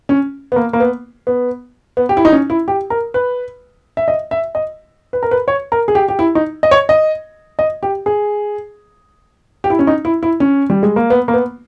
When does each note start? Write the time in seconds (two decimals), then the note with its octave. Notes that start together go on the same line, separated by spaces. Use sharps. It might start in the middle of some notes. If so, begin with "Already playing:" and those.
0.09 C#4
0.52 B3
0.56 A#3
0.73 A#3
0.80 B3
1.27 B3
1.97 B3
2.09 G4
2.17 E4
2.25 D#4
2.32 C#4
2.50 E4
2.68 G4
2.90 A#4
3.14 B4
3.97 E5
4.08 D#5
4.31 E5
4.55 D#5
5.13 B4
5.23 A#4
5.31 B4
5.48 C#5
5.72 A#4
5.88 G#4
5.95 G4
6.08 G4
6.19 E4
6.35 D#4
6.63 D#5
6.71 C#5
6.89 D#5
7.59 D#5
7.83 G4
8.06 G#4
9.64 G4
9.70 E4
9.79 C#4
9.87 D#4
10.05 E4
10.23 E4
10.40 C#4
10.70 G3
10.83 G#3
10.96 A#3
11.10 B3
11.28 A#3
11.34 B3